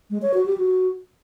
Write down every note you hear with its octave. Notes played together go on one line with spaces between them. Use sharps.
G#3
C#5
F#4
G4
F#4